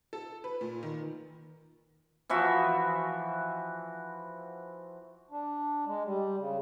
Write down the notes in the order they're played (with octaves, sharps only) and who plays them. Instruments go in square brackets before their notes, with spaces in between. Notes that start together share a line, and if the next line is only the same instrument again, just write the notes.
[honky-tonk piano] A4
B4
A#2
D#3
[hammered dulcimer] E3 F3 F#4 E5
[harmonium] D4
G#3
G3
C#3